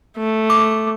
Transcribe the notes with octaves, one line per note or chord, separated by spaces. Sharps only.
A3
D6